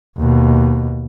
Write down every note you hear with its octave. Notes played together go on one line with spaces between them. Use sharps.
D#2 B2